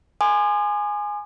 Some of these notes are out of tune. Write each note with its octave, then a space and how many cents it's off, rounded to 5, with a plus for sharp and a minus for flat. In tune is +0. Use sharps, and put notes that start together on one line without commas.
G#5 +0 C6 -15 D#6 -45